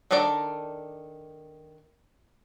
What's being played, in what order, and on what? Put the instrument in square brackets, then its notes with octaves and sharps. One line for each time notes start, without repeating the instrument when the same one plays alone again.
[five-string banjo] D#3 D4 A4 A#4 D5